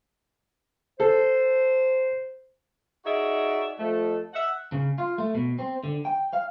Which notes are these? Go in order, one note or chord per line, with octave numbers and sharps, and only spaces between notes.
A4 C5
D#4 F#4 G#4 D5 E5
F2 A3
E5 F#5
C#3
F4
A3
B2
C4
D3
G5
F5